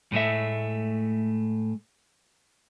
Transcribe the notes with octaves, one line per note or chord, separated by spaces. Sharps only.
A2 G#3 A3 E5